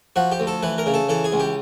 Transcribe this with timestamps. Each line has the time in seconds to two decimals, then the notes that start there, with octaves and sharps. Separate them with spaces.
0.16 F3 F#4
0.32 G4
0.40 D2
0.47 A4
0.63 E3 B4
0.78 A#4
0.86 C#3
0.94 A4
1.09 E3 A4
1.24 G#4
1.32 C#2
1.40 G4